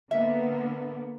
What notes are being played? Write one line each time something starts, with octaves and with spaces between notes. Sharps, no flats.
D3 A#3 B3 E5